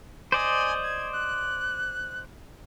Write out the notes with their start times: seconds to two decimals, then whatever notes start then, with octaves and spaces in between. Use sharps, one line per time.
0.32 C5 D5 D#5 G#5
0.83 G#6
1.13 F#6